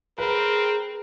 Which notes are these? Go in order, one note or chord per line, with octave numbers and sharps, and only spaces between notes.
C4 G#4 A#4 B4